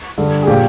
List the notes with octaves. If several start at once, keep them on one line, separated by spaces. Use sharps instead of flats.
G2 D3 G3
G#4
A#2 F3 G4